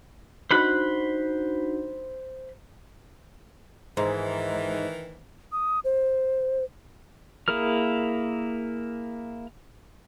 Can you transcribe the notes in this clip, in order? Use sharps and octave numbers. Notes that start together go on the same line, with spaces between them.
D4 D#4 F#4 C5 B5 F#6
G#2 D#3 E3
D#6
C5
A#3 E4 G#4 A#4 F6